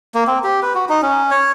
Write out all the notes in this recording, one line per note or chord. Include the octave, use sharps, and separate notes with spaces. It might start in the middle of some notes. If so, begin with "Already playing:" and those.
A#3
C4
G4
B4
F#4
D#4
C#4
C#5